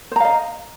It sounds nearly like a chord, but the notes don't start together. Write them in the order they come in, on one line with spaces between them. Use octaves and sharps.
C5 A#5 F5 D#5